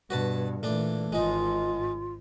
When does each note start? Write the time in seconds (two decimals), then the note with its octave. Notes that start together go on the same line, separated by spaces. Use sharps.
0.10 G2 B2 F#4 B4 A5
0.63 A#2 E3 A3 D4
1.13 G#1 G#2 G#3 D#4 F4